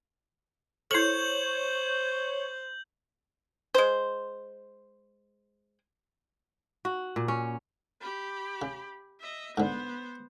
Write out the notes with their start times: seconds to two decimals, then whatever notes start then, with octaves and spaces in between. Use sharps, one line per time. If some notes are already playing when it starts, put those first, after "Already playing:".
0.91 E4 A4 C5 C#5 G6 F#7
3.75 G#3 C5
6.85 F#4
7.16 A#2
7.28 C#4
8.00 G4 B5
8.62 C#3
9.20 D#5 E5
9.57 G#2 D3 B3 C5